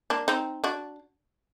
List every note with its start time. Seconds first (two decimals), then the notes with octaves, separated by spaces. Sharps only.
0.10 A#3 D4
0.28 C4 D#4
0.64 D4 F#4